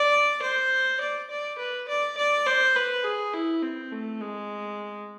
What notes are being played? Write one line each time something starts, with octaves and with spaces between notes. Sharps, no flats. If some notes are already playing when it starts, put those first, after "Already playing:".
Already playing: D5
C5
D5
D5
B4
D5
D5
C5
B4
G#4
E4
C4
A3
G#3